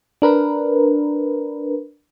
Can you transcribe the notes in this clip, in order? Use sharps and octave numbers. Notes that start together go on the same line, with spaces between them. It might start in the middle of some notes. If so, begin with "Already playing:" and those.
D4 A#4 B4